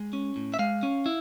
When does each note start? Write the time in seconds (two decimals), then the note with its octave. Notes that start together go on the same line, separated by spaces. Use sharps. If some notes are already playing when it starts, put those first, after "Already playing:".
Already playing: G#3
0.13 C#4
0.36 A2
0.54 E5
0.59 G#3 F5
0.83 C#4
1.06 E4